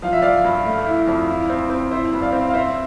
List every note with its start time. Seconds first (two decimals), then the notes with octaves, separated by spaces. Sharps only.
0.02 F3 F5
0.13 E5
0.22 F3 D5 F5
0.44 G2
0.65 A3
0.86 E4
1.07 F2
1.28 E4
1.50 C4
1.70 C4
1.91 E4 C5 E5
2.13 G2
2.22 D5 F5
2.32 C4
2.49 F5
2.54 C4 C5 E5